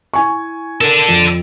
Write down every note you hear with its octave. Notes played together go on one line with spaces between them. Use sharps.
E4 G#5 C#6
D4 A4 A#4
F2